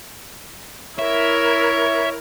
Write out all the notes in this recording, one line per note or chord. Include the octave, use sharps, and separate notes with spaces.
E4 A#4 C#5 E5